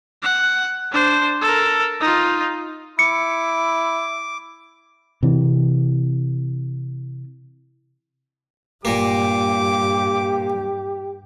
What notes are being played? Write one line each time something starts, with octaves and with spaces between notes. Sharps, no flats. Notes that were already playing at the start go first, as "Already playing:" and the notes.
F#5
D4 C5
A4 A#4
D#4 F4
E4 D6 C#7
C3 E3
G2 A#2 A#3 G4 D6